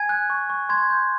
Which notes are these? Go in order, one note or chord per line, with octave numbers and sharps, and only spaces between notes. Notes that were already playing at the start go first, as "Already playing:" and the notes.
Already playing: G#5 G#6
F#6
C#6
C#6
C6 G#6
G6